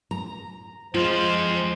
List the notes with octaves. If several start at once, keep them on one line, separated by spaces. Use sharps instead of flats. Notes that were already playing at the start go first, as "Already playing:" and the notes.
A#5
F2 F3 G#3 F4 C5